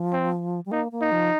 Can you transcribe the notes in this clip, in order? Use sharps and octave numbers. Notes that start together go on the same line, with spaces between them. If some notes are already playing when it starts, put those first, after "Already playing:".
Already playing: F3
C4
G3
A#3 D#4
A#3
D#4
F3